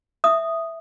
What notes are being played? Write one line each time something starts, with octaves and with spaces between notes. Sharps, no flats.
E5 D#6